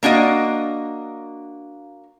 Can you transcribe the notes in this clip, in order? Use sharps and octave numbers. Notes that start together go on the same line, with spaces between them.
A#3 D4 F#4 D#5